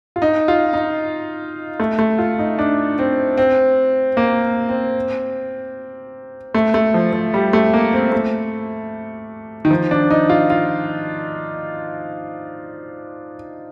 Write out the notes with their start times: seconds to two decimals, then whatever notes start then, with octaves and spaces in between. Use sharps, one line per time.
0.16 F4
0.22 D#4
0.48 F4
0.73 D#4
1.80 A3
1.99 A3
2.19 F4
2.39 D#4
2.59 D4
2.99 C4
3.38 C4
4.17 A#3
4.69 C4
6.54 A3
6.74 A3
6.94 F3
7.13 F3
7.34 G3
7.53 A3
7.73 A#3
7.93 C4
8.12 A3
9.65 D#3
9.71 F3
9.91 D4
10.10 D#4
10.29 F4
10.50 F4